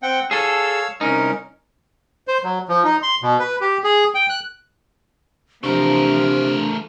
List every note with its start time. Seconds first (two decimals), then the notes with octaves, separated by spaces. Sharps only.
0.03 C4 F#5 G5
0.31 G#4 A4 C#5 F5 E6
1.01 C2 C#4 D#4 A#4
2.28 C5
2.44 F#3
2.68 F3
2.85 D#4
3.02 C6
3.22 B2
3.39 B4
3.61 G4
3.84 G#4
4.14 G5
4.29 F#6
5.64 C3 E3 F3 A3 D4 A#4